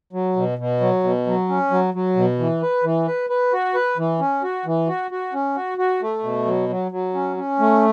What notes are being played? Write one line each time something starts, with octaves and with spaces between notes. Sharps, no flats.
F#3
B2
B2
F#3
B2
F#3
C#4
F#3
F#3
B2
E3
B4
E3
B4
B4
F#4
B4
E3
C#4
F#4
E3
F#4
F#4
C#4
F#4
F#4
A3
B2
F#3
F#3
F#3
C#4
C#4
A3